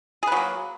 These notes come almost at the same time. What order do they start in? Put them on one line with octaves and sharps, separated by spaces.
G#4 B4 F#3 A#3